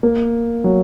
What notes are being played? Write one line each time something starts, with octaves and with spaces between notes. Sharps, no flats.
A#3
F#3